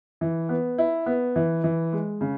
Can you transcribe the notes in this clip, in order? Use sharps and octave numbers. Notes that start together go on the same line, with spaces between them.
E3
B3
E4
B3
E3
E3
G#3
C#3